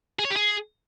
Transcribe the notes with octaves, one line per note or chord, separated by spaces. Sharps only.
G#4
C#5
G4
G#4